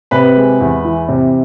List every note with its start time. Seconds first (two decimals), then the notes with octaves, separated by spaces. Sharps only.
0.11 C3 B4 B5
0.36 G#3
0.60 E2
0.85 E3
1.08 C3